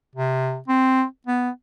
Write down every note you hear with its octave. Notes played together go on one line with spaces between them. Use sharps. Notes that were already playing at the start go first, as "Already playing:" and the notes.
C3
C4
B3